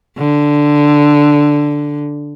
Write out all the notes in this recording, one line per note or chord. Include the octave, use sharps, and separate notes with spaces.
D3